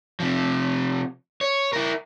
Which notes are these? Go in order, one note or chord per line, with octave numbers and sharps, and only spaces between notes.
C3 F3
C#5
E4 A#4